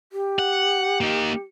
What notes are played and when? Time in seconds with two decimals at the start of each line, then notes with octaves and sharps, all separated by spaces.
0.13 G4
0.39 F#5
1.01 A#3 D#4